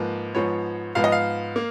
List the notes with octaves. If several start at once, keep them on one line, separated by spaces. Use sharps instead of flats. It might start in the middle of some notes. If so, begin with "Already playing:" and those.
Already playing: G#2 F3 A#3 B4
G#2 F3 B3 C#5
G#2 F3 B3 F5
D#5
F5
A#3